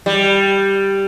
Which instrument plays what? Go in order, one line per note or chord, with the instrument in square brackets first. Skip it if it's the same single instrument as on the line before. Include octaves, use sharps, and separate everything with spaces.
[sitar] G3